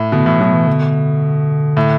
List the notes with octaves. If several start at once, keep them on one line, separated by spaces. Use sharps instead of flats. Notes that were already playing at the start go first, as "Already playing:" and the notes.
Already playing: A2
B2 D3
A2 E3
B2 F#3
E3
D3
A2